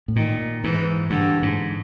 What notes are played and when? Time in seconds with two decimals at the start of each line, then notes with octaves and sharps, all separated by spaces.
0.08 A2
0.16 A#2 D#3
0.64 G#2 E3
1.10 G2 D3
1.42 G#2